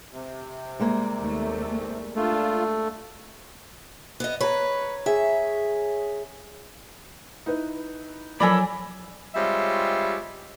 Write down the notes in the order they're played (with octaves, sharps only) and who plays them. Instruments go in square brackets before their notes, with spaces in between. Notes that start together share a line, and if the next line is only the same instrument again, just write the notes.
[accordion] C3
[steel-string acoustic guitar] G3 G#3 A#3
[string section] D#2 A3
[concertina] A3 [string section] D4 [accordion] F4
[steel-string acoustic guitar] B3 D#5
[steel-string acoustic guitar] B4 [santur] C#5 A#5
[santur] G#4 [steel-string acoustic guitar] E5
[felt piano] D#4 E4 B4
[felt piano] F3 [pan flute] F#3 [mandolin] A4 A#4 B5 [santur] D5 G#5
[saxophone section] G3 G#3 C4 F4 C#5 E5